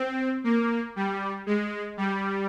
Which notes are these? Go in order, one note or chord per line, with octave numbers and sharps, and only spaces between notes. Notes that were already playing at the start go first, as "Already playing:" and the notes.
Already playing: C4
A#3
G3
G#3
G3